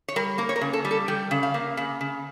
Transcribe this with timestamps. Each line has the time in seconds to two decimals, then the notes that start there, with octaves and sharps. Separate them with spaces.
0.08 C#5
0.16 G3 A#4
0.38 A#3 A#4
0.49 C#5
0.56 A#4
0.61 C#3
0.73 A4
0.85 G3
0.91 A4
1.08 G3 G5
1.31 C#3
1.43 F5
1.54 A#3
1.77 C#3
2.01 C#3